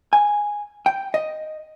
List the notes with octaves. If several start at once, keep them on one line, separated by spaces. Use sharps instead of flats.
G#5
G5
D#5